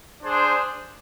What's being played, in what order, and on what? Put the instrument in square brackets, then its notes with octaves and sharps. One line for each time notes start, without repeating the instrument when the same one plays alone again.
[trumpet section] D4 G#4 C5